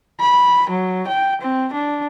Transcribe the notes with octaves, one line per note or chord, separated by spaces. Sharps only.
B5
F#3
G5
C4
D4